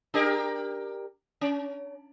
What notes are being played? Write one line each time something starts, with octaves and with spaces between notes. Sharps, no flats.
D4 G4 A#4
C#4